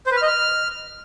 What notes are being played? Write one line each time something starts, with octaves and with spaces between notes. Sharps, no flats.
C5
B4
F6
D#5
F6